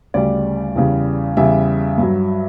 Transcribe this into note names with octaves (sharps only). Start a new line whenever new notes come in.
D2 C#3 G3 D5
E2 C#3 G3
E2 C#3 G3 E5
G2 F#3